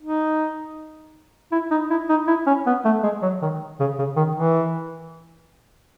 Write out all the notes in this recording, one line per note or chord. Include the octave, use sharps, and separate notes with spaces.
D#4
E4
D#4
E4
D#4
E4
C#4
B3
A3
G#3
F#3
D#3
C#3
C#3
D#3
E3